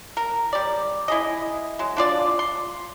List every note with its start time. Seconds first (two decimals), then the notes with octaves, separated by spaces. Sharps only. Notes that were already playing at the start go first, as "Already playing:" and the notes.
0.17 A#4
0.53 G3 D5
1.08 E4 G#4 D#5
1.79 F#3 G#3
1.97 D4 F4 D5
2.39 C6